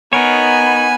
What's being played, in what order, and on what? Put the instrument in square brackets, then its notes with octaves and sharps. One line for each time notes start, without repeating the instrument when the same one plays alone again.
[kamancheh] B3 [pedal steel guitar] D#4 A#4 C#5 [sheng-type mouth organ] G#5